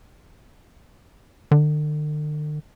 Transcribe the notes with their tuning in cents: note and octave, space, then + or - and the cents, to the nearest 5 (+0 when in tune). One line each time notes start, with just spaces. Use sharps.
D3 +45